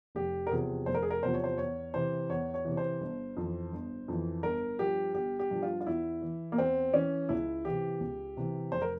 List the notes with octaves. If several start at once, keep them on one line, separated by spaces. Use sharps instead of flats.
F1 G4
A#4
E2 C3 F3 G#4
F1 C5
A#4
G#4
A#4
E2 C3 F3 C5
C#5
C5
E2 C#5
C3 E3 C5
E2 C#5
C#5
C3 E3
C5
G1
F2 E3
G1
F2 E3
G1 A#4
G2 F3 G4
G1 G4
G4
G2 F3
F4
F4
E2 E4
E3
A#3
E2 C4
E3 C#4
C#2 E4
C3 E3 G4
C#2
C3 E3
F1 C5
A#4